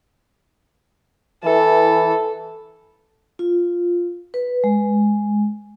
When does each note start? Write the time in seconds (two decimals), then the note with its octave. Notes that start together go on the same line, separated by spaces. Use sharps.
1.43 E3 A4
3.39 F4
4.34 B4
4.64 G#3